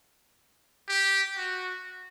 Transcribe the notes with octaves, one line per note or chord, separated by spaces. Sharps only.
G4
F#4